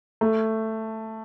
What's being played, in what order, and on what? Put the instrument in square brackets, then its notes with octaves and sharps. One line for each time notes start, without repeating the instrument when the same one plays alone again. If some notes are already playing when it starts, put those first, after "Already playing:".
[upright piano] A3